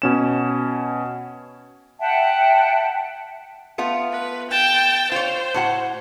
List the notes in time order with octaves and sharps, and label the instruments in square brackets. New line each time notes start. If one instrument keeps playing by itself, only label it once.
[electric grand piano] B2 C#4 E7
[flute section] E5 F#5 G5 A5
[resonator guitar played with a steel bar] A3 B3 F4
[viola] B4
G5 A5
[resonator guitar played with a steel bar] F4 C#5 [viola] C5
[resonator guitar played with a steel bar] A2 F#4 F#5